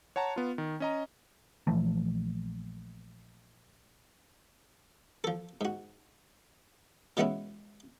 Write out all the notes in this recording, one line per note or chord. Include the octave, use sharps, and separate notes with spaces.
C#5 F#5 A5 A#5
B3 F4
D#3
C#4 D#5 A#5
A#1 E3 F3 A3
F3 A4
G#2 F#4
B2 E3 G#3 B3 C#4 E4